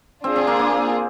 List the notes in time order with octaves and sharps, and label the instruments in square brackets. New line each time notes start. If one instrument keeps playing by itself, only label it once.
[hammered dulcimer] C4 [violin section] D4 F4 G#4
[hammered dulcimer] C4
A#3
A#3